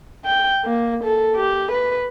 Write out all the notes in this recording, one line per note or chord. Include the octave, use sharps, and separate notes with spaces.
G5
A#3
A4
G4
B4